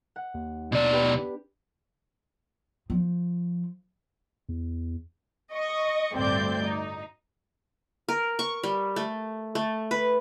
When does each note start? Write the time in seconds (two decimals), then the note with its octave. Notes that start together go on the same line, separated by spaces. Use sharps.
0.16 F#5
0.34 D#2
0.72 B2 D4 D5
0.93 B3 G4 B4
2.90 F3
4.49 E2
5.54 D#5 C#6
6.13 A1 D2 G2 C4 D5 G6
6.63 D#4
8.08 A#4
8.39 C#6
8.63 G3
8.96 A3
9.55 A3
9.91 B4